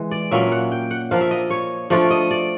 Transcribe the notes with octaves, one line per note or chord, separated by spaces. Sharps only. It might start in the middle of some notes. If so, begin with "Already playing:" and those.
Already playing: E3 G#3
D5
A#2 F#3 A#3 C#4 E5
F#5
G5
F#5
F3 A#3 D4 F5
E5
D#5
C#5
F3 A3 D4 F4 D5
D#5
D5